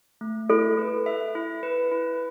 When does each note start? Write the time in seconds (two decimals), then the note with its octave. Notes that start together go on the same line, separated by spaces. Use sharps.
0.21 A3
0.50 E4 A4
0.78 B4
1.06 E5
1.35 E4
1.63 B4
1.92 E4